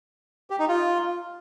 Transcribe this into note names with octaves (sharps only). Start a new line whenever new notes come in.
G4
D#4
F4